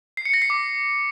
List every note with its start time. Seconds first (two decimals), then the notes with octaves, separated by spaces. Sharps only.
0.17 C7
0.25 C#7
0.34 A#6
0.42 C7
0.50 D6